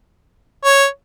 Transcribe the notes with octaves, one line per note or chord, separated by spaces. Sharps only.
C#5